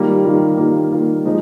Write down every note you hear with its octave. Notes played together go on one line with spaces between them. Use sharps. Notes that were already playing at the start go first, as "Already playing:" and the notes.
Already playing: D#3 G3 A#3 F4
D#3 G3 A#3 F4
D#3 G3 A#3 F4
D#3 G3 A#3 F4
F3 G#3 D#4